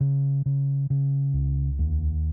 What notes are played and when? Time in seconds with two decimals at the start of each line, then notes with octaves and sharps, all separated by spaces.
0.01 C#3
0.46 C#3
0.90 C#3
1.34 C#2
1.79 D#2